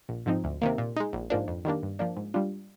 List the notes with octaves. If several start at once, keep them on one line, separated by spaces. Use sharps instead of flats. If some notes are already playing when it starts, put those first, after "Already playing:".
A#1
G#2 F3 C4 D#4
D2
C3 D#3 A#3
A#2
G#3 D#4
A#1
G#2 F3 A#3 D4
F2
D#3 G3 A#3 D4
G2
F3 A#3 D4
G#2
G3 D4 F4